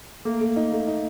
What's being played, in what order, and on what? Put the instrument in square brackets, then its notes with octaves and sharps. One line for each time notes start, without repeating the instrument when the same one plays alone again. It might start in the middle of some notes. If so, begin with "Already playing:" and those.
[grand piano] A3 [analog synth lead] A#3
[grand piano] A3
D#4
A3
D#4